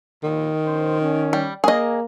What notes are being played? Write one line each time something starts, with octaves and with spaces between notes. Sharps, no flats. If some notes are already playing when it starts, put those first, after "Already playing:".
A#1 D#2 D#3
A#1 C#4 C5
C#4
G3
A#3 G#4 D#5